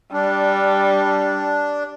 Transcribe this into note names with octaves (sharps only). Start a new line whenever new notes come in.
G3 D4